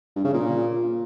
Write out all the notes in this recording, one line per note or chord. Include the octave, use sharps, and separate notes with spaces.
G2
C#3
A#2